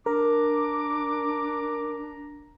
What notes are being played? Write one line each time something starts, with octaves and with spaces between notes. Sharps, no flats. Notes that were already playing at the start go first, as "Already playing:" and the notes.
D4 A#4 A#5 D6